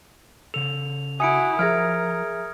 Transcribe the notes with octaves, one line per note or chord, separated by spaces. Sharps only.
C#3 A4 F7
E4 F#4 G#5 D#6 C#7 D7
F3 G#4 A#4 E5 F6 G#6 A#6 D7